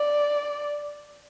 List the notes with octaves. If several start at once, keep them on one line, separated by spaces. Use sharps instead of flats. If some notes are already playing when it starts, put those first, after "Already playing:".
Already playing: D5